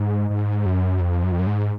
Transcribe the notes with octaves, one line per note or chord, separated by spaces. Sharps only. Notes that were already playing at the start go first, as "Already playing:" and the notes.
Already playing: G#2
G#2
F#2
F2
F#2
F2
F#2
G#2